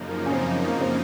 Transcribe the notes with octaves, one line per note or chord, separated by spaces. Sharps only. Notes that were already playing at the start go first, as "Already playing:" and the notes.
Already playing: F#2 C#3 F3 A#3 D#4
A#4
C#4
C4
A#3
C4